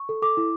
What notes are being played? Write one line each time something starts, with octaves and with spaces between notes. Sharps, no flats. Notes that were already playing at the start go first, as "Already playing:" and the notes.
Already playing: C#6
A4
A4 D6
E4